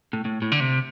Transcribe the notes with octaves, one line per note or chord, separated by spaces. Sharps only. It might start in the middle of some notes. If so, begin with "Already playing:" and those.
A2
A2
A2
D3
C3